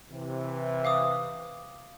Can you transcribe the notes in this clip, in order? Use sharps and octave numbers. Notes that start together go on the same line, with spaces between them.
C3 E3
F5 D6 D#6